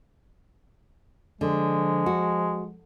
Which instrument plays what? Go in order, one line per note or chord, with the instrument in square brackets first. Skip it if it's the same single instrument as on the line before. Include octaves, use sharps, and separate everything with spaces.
[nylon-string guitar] D3 [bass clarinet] F3 [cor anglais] G#3
[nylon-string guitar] F#4